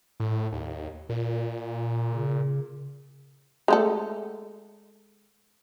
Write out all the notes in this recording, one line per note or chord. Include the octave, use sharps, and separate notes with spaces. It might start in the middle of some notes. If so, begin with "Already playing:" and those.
A2
D#2
A#2
C#3
G#3 A3 A4